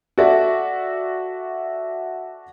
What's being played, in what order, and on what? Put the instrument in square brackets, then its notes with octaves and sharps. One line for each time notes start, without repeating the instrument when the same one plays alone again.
[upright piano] F#4 A4 D5 E5